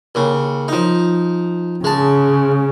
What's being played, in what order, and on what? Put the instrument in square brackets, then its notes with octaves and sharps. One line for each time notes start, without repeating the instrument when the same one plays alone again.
[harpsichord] D#2 C#3
F3 D#4
[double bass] C#3 [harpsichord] G#3 A5